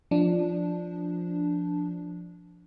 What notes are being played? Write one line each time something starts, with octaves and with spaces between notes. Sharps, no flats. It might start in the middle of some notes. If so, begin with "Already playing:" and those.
F3 D4